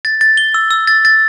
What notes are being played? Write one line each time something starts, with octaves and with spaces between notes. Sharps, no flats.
A6
A6
G7
E6
E6
A6
A6